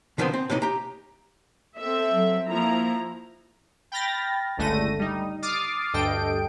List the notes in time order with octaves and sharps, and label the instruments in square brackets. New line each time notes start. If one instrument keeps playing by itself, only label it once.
[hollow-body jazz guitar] B2 D3 D#3 F3 B3 C4
C4
A2 C3 E3 G3 D#4
G4 A#5
[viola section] C4 A4 E5
[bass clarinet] F#3
[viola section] F3 E4 A#5 [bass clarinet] A#3
[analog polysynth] G5 B5 F6 A6 A#6
G1 C#2 D3 A3 A#6 D#7
G3 D#4
D6 D#6 F6 A6 C7
D2 G2 A4 D#5 G5 D7